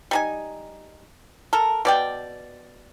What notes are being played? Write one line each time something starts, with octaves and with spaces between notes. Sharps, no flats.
G3 D#4 G#5
A4 A#4
B2 D5 G5